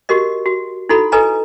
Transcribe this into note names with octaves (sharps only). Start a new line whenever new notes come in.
F#4 G4 A#4 D#5
F#4
D#4 E4 F#4 A4 B5
A4 B4 D#5 G#5 A#5